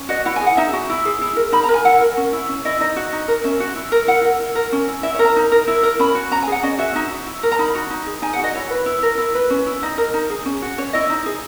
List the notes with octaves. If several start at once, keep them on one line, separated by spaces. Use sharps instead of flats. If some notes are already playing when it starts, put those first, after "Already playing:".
Already playing: C#4
F#4 D#5
E4 F#5
G#5
G#4
F#5
D#4 E5
F#4
E4
G#4
E4
A#4
D#4 B5
A#5
A#4
G#5
E4 F#5
A#4
C#4
E4
C#4
E4 D#5
D#4 D#5
F#4
D#4
A#4
C#4 E5
F#4
E4
A#4
E4 F#5
A#4
E4
A#4
C#4
E4
E4 E5
C#5
A#4
A#5
D#4
A#4
E4
A#4
C#4 B5
F#4
C#4 A#5
G#5
G#4 F#5
C#4 D#5
F#4 E5
D#4 E5
F#4
E4
A#4
A#5
D#4 B5
F#4
D#4
G#4
D#4 G#5
F#5
F#4 D#5
E4 C#5
B4
E4
A#4
E4
B4
C#4
E4
D#4 D#5
A#4
D#4
G#4
C#4
F#4
C#4 C#5
E4 D#5
D#4
G#4